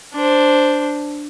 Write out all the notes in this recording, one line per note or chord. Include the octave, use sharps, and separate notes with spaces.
D4 C5